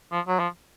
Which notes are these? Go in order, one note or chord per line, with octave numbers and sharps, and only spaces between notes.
F3
F#3
F3